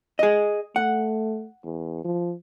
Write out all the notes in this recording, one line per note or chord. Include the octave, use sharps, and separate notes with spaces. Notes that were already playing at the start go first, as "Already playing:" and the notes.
G#4 D#5
A3 F#5
E2
F3